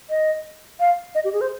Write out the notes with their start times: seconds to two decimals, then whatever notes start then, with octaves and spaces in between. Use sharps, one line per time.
0.10 D#5
0.80 F5
1.15 D#5
1.24 G4
1.33 G#4
1.41 C5